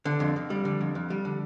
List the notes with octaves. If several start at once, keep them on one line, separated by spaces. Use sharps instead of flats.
D3
F2
F2
G3
D3
F2
F2
G3
D3